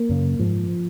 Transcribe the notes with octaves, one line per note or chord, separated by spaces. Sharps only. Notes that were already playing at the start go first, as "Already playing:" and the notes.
Already playing: A#3
F#2 C#3
G#2 F3